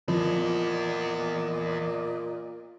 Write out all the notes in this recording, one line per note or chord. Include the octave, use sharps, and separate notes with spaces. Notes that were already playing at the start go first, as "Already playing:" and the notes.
E2 A#2 F3 D5 D#5